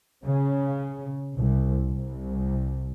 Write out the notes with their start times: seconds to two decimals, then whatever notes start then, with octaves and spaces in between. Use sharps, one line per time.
0.23 C#3
1.38 C2
1.89 C2